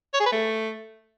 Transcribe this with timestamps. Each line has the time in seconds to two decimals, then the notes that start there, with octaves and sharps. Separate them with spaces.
0.14 C#5
0.20 G#4
0.26 B4
0.32 A3